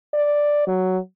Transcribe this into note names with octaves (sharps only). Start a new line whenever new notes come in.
D5
F#3